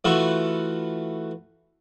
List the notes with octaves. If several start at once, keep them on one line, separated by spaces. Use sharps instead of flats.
E3 A3 F4 F#4 A4 B4